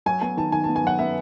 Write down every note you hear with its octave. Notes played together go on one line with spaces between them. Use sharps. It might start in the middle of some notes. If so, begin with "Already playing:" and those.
F#3 G#5
B3 G#5
D#3 A5
D#3 G#5
A5
B3
G#5
F#3 F#5
B3 E5